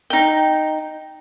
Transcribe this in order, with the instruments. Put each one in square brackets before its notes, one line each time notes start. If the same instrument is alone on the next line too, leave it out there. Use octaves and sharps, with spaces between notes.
[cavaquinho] D#4 G5